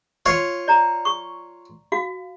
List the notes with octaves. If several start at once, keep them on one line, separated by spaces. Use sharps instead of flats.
F4 C#5
D5 A#5
C#6
F#4 F5